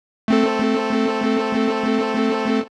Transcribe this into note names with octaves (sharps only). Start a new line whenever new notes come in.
A3 C4 A4